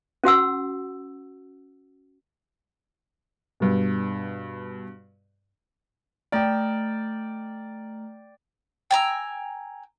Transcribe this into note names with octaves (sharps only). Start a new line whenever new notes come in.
C#4 F#4 F#5 E6
G2 B2
A3 D5 G5 A#5 F6
G5 G#5 A#5 E6